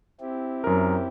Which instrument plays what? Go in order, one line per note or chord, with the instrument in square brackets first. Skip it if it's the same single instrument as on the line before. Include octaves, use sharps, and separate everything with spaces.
[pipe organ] C4 E4 G4
[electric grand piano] F#2 A#4